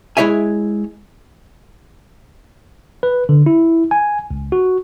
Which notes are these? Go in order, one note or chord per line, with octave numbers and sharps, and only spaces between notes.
G#3 E4 C#5 E5 G#5
B4
D3
E4
G#5
C#2
F#4